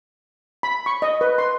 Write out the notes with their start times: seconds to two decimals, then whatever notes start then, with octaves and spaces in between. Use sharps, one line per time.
0.63 B5
0.86 C#6
1.02 D#5
1.21 B4
1.38 C6